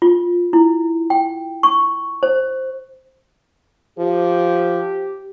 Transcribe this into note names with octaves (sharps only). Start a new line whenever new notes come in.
F4
E4
G5
C#6
C5
F3 G4